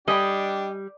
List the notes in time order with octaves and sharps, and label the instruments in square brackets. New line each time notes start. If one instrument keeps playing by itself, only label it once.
[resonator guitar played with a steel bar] G3 [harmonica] D4 G4 [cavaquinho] D#5 G#5 B5